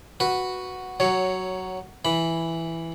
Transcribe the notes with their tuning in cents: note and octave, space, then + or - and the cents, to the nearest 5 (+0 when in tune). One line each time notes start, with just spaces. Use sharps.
F#4 +0 B4 +0
F#3 +10 C#5 +0
E3 +0 B5 +0